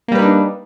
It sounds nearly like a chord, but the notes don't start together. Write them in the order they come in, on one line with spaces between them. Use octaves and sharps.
A#3 G3 B4 D#4 D4